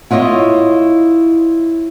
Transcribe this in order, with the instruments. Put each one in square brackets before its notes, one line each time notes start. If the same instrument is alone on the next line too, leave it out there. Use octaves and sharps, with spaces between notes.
[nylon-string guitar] E4 F4 C#5 D#5